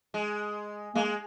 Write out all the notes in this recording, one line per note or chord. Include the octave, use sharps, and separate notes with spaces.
G#3
G#3 A#3